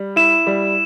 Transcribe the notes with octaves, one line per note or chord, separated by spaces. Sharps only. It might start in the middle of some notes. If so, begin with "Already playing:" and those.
Already playing: G3
E4 E7
G3